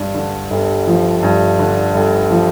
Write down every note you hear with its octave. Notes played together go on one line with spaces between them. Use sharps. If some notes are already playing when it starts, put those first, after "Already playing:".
Already playing: G2
D3
G1
F3
G2
D3
G1
F3